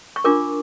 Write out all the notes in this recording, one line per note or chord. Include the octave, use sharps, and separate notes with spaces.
C#6
D4 F4 A#4 D6